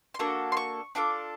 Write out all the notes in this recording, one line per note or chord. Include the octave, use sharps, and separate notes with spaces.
C6
A#3 D4 F#4 A4 C#6
C6
C#6
D4 F4 A4 D6